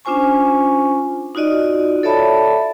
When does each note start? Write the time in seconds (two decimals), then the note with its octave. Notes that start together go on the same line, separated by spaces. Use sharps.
0.05 C#4 D4 F4 C5 G#5 C#6
1.35 D#4 F4 F#4 D5 D#5
2.03 A4 C#5 D5 E5 A5 B5